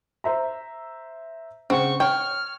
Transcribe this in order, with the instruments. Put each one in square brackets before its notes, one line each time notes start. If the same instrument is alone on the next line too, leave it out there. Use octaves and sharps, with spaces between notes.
[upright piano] C5 E5 A#5
[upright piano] C#3 F#5 [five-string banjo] C4 [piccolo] C#6
[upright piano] C#5 [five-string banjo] G5 [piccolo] F6